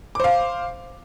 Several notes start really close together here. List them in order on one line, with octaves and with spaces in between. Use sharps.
D6 C5 F5